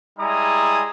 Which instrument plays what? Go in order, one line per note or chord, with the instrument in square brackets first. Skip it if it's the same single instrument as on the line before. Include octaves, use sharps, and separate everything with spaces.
[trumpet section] G3 G#3 E4 G#5 A#5 D#6